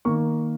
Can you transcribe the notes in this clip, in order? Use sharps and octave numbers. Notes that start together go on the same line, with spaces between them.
D#3 A#3 C#6